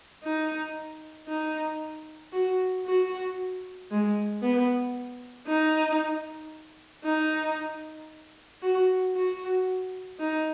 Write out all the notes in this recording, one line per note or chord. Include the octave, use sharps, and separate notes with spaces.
D#4
D#4
F#4
F#4
G#3
B3
D#4
D#4
F#4
F#4
D#4